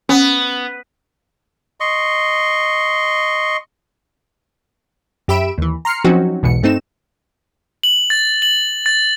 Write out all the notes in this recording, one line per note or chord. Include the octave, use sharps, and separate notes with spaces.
B3 C#4
D#5 C6 C#6
F#2 G4 E5 B5 D7 E7
D#2 E3
A#5 C6 F6 C7 C#7
F3 F#3 C4 C#4 D#4 F#4
B1 E2 G#2 B2 C#7
G2 A3 C4 D#4 E7
F#7
A6
F#7
A6